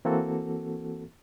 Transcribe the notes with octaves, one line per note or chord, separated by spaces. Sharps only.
E3 A#3 C4 F#4 A4